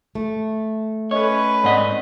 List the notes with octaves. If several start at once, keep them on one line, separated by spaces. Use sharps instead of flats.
A3
C#4 A4 B4 C#5 D#5
G#2 C4 D5 D#5 F#5 B6